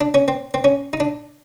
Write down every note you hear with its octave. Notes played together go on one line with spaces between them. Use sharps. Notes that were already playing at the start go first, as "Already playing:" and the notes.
D4
C#4
C4
C4
C#4
D#4
D4